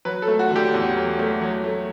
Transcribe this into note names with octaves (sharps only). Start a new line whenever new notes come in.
F#3 B4
A4
A3
F#4
D3 G4
E2
F#3
A3
F#3
A3